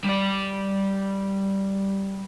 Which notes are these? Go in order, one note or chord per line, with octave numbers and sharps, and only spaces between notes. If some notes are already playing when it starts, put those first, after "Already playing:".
G3 D5